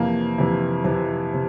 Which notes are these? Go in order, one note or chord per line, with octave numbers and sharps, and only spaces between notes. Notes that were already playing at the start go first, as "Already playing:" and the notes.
Already playing: F2 C3 E3 A#3
F2 C3 E3
F2 C3 E3
C3